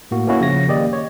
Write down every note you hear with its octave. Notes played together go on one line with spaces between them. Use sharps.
A2 A#3 F#4
A#3 B3 C#4 E4 F#4 C#5
C#3 F3 C#5 A#6
D#3 A#3 G4 D5 D#5
C#5